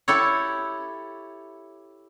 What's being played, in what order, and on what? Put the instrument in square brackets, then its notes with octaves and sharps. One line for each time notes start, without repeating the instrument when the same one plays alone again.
[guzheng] E4 G4 A4 C#5